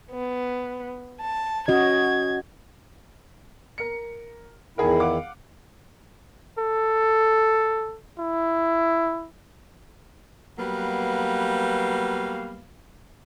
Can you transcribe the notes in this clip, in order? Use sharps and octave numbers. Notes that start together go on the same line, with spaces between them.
B3
A5
C#4 F#4 D#5 G#6
A#4 C#7
E2 D#3 E4 G#4 A#4
F5 F#5 D6
A4
E4
F#3 G3 A#3 B3 B4 F5